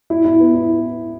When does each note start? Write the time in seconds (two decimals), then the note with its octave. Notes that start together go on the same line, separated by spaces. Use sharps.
0.10 E4
0.25 E4
0.40 B3
0.54 E4